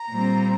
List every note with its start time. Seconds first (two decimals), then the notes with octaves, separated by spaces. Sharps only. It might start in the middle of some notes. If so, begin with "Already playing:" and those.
Already playing: A#5
0.10 A#2 G3 C4